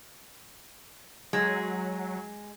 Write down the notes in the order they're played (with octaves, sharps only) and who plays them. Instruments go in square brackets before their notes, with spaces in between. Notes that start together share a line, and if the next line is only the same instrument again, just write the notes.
[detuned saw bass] F#3 [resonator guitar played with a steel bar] G#3